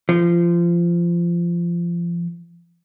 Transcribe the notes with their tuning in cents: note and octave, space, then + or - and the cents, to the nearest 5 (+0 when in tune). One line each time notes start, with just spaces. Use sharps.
F3 -25